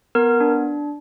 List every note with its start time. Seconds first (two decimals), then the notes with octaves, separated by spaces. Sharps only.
0.15 B3 A#4
0.40 D4